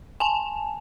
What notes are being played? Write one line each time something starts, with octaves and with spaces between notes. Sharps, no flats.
G#5 A5